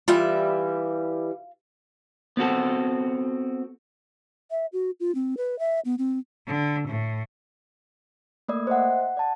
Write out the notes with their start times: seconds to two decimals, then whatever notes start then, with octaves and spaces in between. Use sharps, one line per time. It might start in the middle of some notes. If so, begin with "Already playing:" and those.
0.08 E3 G3 F4 E5
2.37 B3 C4 F#4 A4
4.51 E5
4.73 F#4
5.00 F4
5.15 C4
5.37 B4
5.59 E5
5.85 B3
5.98 C4
6.47 D3
6.87 A2
8.48 A3 A#3 D5 D#6
8.67 C5 D#5 E5 F#5
9.00 F#5
9.17 D5 A5